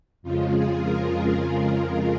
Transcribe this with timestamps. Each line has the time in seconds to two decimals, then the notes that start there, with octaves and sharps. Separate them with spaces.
0.22 F2 C#3 F3 G#3 F4
0.53 G#4
0.82 A#4
1.41 A#4
1.70 G#4